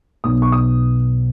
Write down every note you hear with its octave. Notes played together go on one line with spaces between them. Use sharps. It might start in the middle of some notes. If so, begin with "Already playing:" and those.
B1 B2 B3 D#6
C#6
D#6